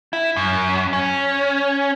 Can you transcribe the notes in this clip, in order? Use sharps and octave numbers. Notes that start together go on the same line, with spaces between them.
E4
F#2
C#4